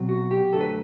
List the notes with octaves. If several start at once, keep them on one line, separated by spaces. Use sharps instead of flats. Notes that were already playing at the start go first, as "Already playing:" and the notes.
Already playing: B2 F#3 C4
F#4
G4
F#2 D3 F#3 A3 A4
B4